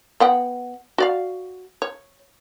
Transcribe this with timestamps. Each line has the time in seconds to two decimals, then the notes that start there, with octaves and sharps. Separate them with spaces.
0.20 B3 F#5 G5
0.98 F#4 D5 F5
1.82 C#5